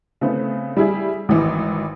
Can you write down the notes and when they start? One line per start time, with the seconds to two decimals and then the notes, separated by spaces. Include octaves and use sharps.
0.21 C#3 A3 B3 C4
0.77 G3 E4 G#4
1.29 G#1 E3